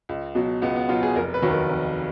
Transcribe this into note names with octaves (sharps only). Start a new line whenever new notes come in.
C#2
B2 F#3
C#2 B3
B3
B2 F#3 F4
G#4
F1 A#4
B4
D#2 D#3 F#3
A#4
F1